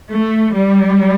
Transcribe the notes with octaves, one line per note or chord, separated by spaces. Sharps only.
A3
G3